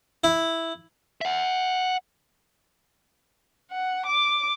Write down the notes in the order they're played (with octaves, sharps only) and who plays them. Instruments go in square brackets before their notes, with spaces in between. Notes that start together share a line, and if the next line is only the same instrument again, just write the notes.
[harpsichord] E4
[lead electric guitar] E5 F#5
[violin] F#5
D6